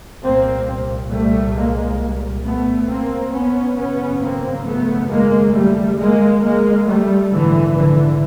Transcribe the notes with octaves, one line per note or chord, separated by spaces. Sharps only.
C2 A#2 A#3 C4
G3 A3
G#3 A#3
A3 B3
A#3 C4
B3 C#4
G#1 F#2 C#3 B3 C#4
A#3 C4
A3 B3
G#3 A#3
G3 A3
G#3 A#3
G#3 A#3
G3 A3
A#1 G#2 D3 E3
D3 E3